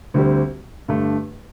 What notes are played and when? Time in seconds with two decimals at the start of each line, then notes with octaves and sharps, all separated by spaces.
0.14 D2 D3 G3 C4 G4
0.88 G2 D3 A3